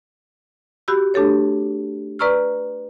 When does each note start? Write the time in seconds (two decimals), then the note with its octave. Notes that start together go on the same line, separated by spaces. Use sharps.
0.88 F#4 G4 B5 E6
1.14 A3 D4 G4 A4 C#5
2.19 B4 D5 A#5 C#6 E6 F6